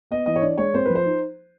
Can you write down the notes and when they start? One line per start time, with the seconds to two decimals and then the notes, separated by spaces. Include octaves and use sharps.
0.11 B3 D#5
0.26 E3 D#5
0.36 C#5
0.42 D4 D5
0.58 G#3 C#5
0.74 C4 C5
0.85 B4
0.90 F3
0.95 C5
1.05 D#4